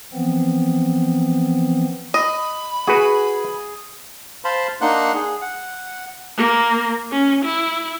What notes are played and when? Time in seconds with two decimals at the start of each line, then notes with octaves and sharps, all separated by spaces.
0.14 E3 F3 B3 C4
2.14 D#5 B5
2.87 F#4 G#4 B4 G#5
4.44 C5 F5 A5 B5 C6
4.81 A#3 D4 D#4 F#5 C6 F#6
5.15 G#4
5.41 F#5
6.37 A#3
7.12 C#4
7.45 E4